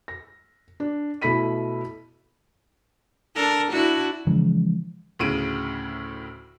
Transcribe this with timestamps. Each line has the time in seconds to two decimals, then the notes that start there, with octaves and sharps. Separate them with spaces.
0.08 A#6
0.80 D4
1.22 B2 A3 E4 B5 B6 D#7
3.36 D4 A4 A#4
3.70 D4 E4 F#4
4.27 C#3 E3 F3 G#3
5.19 D2 A2 C#3 D7 D#7